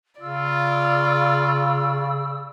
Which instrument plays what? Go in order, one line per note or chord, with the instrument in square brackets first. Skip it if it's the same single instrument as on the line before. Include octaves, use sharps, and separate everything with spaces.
[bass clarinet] C#3 [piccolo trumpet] F4 [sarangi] D5 [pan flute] E6